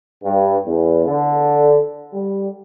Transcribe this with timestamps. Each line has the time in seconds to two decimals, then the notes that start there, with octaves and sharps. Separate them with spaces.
0.24 G2
0.66 E2
1.06 D3
2.13 G3